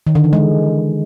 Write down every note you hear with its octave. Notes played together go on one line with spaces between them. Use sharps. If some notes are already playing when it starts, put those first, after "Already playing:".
D#3
D3
E3
G#3